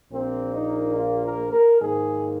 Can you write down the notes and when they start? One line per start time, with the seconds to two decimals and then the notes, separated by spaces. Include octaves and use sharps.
0.11 A#1 A#2 A#3 C4
0.54 D#4
0.96 F4
1.25 A#4
1.53 A#4
1.81 G#2 D#3 A#3 G#4